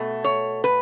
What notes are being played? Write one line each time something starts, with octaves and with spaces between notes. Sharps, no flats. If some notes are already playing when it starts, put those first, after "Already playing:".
Already playing: B2 A3
C#5
B4